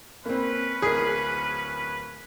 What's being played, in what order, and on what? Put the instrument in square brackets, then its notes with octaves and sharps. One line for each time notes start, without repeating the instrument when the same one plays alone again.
[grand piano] A#3 C4 [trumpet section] C#4 B4
[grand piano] D1 A#4 [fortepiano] G#4